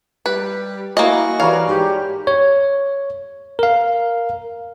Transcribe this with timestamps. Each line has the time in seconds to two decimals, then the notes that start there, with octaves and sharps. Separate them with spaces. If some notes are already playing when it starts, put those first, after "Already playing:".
0.26 G3 B4
0.97 A#3 E4 F#4 D#5 G#5
1.40 E3 G3 A#4 C#5 F5
1.67 G#2 G4
2.27 C#5
3.59 A#4 F5